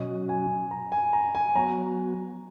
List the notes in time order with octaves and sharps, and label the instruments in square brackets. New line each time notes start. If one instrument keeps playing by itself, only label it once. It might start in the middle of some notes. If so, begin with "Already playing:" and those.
Already playing: [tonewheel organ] B2 F#3 C#4 F#4 [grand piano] D#5
[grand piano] G#5
A#5
G#5
A#5
G#5
[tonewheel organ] F#3 B3 F#4 [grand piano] A#5